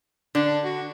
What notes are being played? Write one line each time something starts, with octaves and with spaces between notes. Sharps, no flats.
D3 D4
F#4